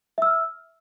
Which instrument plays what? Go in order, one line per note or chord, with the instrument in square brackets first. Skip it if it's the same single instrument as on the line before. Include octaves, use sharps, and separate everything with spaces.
[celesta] E5
E6
F6